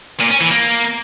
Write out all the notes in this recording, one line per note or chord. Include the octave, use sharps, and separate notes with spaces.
A#2
C#4
E3
A#3